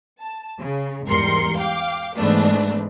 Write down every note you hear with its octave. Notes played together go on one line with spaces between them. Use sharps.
A5
C#3
E2 G#2 G3 A#4 C6 C#7
F5 G5 D6
G#2 E3 A3 B3 D4